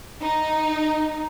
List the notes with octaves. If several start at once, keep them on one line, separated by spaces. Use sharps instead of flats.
D#4